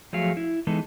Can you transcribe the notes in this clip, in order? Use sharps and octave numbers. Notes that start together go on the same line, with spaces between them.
F3 F#3 A3 G#4 F5
E4
E3 G#3 B3 D#4 A4